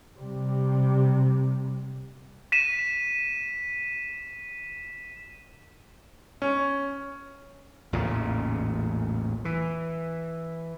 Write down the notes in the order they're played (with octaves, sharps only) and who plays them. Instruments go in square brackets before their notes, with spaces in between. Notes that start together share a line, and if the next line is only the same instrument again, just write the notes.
[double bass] C3 G3
[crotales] B6 D#7 E7
[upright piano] C#4
[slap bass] A1 E2 A#2 C#3
E3